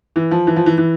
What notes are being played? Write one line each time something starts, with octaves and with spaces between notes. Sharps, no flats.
E3
F3
E3
F3
E3
E3